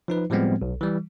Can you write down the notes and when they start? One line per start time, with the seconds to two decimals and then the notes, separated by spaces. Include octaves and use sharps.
0.08 F3 D#4 B4
0.30 A2 F3 G3 G#3 B3 C4
0.62 B1
0.81 E3 G3